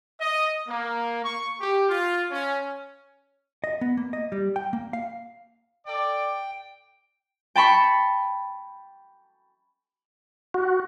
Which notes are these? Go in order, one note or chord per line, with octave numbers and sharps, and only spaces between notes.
D#5
A#3
C#6
G4
F4
C#4
D#5
B3
A#3
D#5
G3
G5
A#3
F5
A4 D5 G5
G5 A5 B5 C#6
F#4